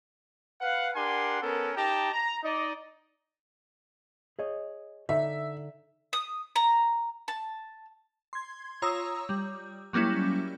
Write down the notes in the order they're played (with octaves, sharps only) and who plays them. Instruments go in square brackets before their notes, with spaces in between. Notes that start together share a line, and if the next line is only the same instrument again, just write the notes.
[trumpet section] B4 F5 F#5
D4 G4 A#4 F#5 G#5 C6
B3 C#4 A4 A#4
D#4 G4 G5 A5 A#5
A#5
D#4 D5 D#5
[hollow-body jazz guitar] G#4 C#5 D#5
[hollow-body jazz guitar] D3 D#4 A4 [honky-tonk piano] E5
[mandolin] D#6
A#5
A5
[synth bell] C6 G#6
F4 C#5 A#5 D#6 E6
G3
F#3 G3 A#3 C#4 E4